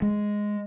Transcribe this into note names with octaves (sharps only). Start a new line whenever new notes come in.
G#3